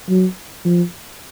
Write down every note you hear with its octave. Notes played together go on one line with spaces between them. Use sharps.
F#3
F3